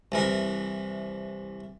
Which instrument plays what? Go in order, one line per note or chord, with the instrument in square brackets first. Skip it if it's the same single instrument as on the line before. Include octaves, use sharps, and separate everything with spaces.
[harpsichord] C2 E3 A#4